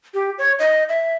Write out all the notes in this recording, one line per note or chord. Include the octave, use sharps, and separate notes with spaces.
G4
C#5
D#5
E5